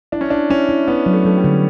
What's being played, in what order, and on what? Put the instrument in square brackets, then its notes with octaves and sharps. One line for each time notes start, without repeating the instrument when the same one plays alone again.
[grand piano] D4 [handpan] E4
[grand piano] C#4
[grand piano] D4 [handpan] E4
[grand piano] C#4 [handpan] E4
[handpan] E4
[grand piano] B3 [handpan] E4
[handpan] F#3
[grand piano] A3
[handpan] F#3 [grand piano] A3
[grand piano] G3
[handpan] D3